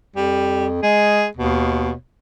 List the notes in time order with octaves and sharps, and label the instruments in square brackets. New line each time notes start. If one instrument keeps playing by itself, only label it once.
[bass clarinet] F2 [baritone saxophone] G3
[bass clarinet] G#3 [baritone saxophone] G#4
[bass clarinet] D#2 [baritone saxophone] B2